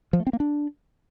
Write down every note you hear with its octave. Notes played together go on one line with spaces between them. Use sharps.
F3
A3
C4
A#3
D4